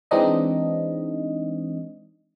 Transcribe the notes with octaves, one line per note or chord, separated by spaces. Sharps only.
E3 G#3 C4 D4 D#4 D#5